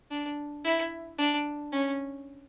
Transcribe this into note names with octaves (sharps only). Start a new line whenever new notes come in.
D4
E4
D4
C#4